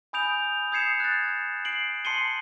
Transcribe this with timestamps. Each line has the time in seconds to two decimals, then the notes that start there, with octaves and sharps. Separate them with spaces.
0.13 G#5 B5 D#6 G6 D7 F7
0.72 D#6 G6 G#6 C7 C#7 E7
1.00 F#6 A6
1.65 C7 D7 F#7
2.05 A5 C6 C7 C#7 D#7 G7